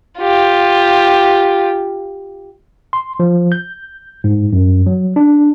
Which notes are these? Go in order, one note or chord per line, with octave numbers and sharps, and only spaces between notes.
F4 G4
C6
F3
G6
G#2
F#2
F#3
D4